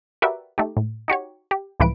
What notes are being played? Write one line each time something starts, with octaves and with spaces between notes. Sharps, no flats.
F#4 G4 A#4 B4 D5 E5
A3 D#4 G4
A2
D#4 F#4 G4 C#5
G4
C#2 A2 E3 F3 B4 D7